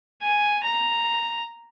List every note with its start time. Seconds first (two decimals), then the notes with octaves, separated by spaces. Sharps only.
0.22 G#5
0.64 A#5